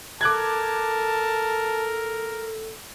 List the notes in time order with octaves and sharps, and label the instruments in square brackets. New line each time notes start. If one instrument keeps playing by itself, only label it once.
[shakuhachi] A4 [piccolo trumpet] A#4 [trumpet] A5 [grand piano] D6 F#6 G#6